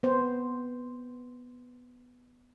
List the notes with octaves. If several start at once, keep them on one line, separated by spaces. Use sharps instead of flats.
B3 C5